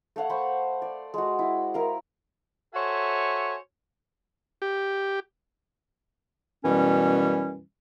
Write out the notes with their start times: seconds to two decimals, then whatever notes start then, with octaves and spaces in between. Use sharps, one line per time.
0.16 A3 C#5 F5 F#5
0.30 C5 B5 C#6
0.82 D5
1.14 G#3 F#4
1.39 E4
1.74 E4 A#4 F5
2.74 F#4 A4 C5 C#5 E5 G#5
4.62 G4
6.64 F#2 B2 E3 G3 C#4